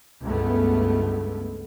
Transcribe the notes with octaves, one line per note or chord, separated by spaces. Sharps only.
C#2 G2 A3 B3